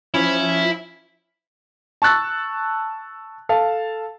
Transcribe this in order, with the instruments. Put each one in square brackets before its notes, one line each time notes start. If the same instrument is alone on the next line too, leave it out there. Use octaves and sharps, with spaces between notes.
[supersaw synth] F3 [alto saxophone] C#4 [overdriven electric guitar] E4
[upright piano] A5 C#6 E6 F#6 A6
A4 F5 A5